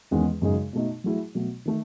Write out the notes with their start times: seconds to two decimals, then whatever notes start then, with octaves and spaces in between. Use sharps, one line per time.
0.11 E2 D#3 G#3 C#4
0.42 F#2 C#3 G#3 D#4 G#4
0.73 B2 A3 D#4
1.04 F#3 A3 E4 G#4
1.35 B2 F#3 A3
1.65 D#3 A3